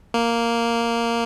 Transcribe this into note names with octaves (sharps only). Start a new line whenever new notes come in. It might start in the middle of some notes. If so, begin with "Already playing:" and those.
A#3